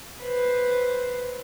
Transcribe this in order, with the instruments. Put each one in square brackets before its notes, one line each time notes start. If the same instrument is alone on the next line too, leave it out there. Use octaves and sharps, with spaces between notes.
[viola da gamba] B4 C5